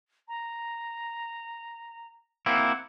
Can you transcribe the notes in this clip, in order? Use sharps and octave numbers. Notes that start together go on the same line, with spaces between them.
A#5
A#3 C4 E4 F#5